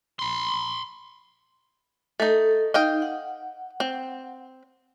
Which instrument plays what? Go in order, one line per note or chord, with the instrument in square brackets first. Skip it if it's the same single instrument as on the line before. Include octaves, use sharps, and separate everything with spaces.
[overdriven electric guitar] B5 C6
[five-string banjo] A3 D#4 [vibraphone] A4
[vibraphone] D#4 [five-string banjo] D#5 F5 G5
[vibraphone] F#5
[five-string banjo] C4